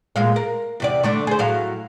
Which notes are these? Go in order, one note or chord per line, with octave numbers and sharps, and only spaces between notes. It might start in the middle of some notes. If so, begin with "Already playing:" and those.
A#2 G#3 F5
A#4
E2 C3 D5
D3 A3 D4
G#4 C5
A2 F#3 F5